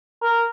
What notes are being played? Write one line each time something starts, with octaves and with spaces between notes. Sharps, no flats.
A#4